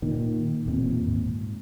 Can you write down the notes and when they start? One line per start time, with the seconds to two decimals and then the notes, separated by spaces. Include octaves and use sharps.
0.02 A#2 D#3
0.66 E1 D#2 A#2 C4
1.05 G#2